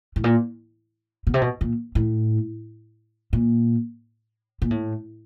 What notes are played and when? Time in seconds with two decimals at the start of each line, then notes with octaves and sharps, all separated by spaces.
0.16 A2
0.24 A#2
1.27 B2
1.34 C3
1.41 B2
1.61 A#2
1.95 A2
3.33 A#2
4.62 A#2
4.71 A2